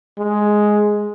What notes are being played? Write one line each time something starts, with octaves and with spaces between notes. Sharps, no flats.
G#3